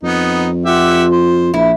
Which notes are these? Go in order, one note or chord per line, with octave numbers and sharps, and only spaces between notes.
F2 B3 D#4
F4 G4 E5 F#5
C5
A#1 E4